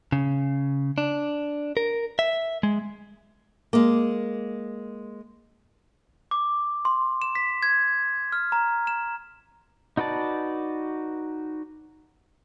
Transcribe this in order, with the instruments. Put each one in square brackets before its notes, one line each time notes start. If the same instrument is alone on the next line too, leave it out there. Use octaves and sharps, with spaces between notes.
[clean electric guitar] C#3
D4
A#4
E5
G#3
[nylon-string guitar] G#3 A#3
[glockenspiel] D6
C6
E7
B6
G#6
F6
A#5
E7
[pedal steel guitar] D#4 F#4 B4 D5 A5